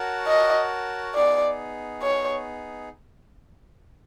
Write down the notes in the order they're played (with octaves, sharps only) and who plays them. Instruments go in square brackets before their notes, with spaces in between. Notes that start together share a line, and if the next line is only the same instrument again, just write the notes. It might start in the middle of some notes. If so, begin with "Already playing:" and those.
Already playing: [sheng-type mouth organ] F#4 A#4 C#5 F#5 A5
[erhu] D#5
[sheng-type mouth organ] B3 D#4 G#4 [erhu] D5
[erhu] C#5